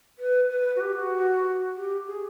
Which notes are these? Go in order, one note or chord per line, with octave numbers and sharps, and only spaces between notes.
B4
B4
F#4
G4
F#4
G4
G#4